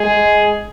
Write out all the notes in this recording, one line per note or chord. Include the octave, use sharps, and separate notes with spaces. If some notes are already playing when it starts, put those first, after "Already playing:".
Already playing: G#3 G#4